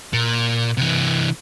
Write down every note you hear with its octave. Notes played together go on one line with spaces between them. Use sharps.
A#2
C3 E3